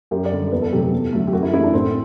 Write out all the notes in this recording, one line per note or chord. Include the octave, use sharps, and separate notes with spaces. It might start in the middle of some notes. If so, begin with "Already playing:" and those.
F#2 G4
D5
D3 G3
E2 B4
A4
C3 F#3 A3 G4
A4
E2
D3 F#3 A3
G4
F#2 F#4
E4
E3 A3 E4
D4
A2 C4